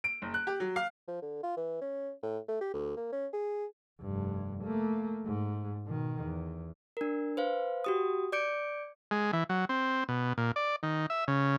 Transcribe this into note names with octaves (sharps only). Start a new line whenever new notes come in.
D7
F#1
F#6
G4
F#3
F5
F3
D3
F4
E3
C#4
A2
A3
G4
D2
A#3
C#4
G#4
F1 G2
A3 A#3
G#2
B2 D#3
E2
D4 A#4
B4 C5 F5
F#4 G4 D#6
D5 D6 G6 C#7 D7
G#3
E3
F#3
C4
B2
A#2
D5
D#3
E5
C#3